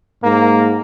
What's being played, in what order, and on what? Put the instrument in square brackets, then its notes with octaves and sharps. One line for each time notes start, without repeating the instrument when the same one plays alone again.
[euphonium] G#2 [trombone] A#3